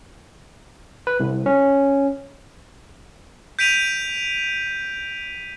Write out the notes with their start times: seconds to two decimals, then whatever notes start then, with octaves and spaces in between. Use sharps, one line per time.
1.07 B4
1.20 C2
1.46 C#4
3.59 G6 B6 D7 D#7 F7